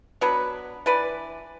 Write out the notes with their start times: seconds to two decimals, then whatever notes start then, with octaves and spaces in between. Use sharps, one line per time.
0.21 F#3 B3 D4 B4
0.86 E3 D4 B4 D5